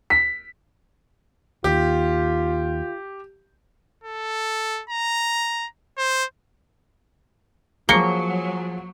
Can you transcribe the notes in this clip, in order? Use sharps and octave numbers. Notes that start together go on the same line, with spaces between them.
B6
D#2 F4 G4
A4
A#5
C5
F3 F#3 A#3 G#4 C#6 C#7 G7